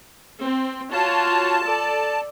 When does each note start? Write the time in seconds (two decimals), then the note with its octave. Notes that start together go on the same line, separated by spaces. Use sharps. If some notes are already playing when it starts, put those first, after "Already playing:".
0.43 C4
0.92 F4 F#4 C#5 A5
1.63 A4 D5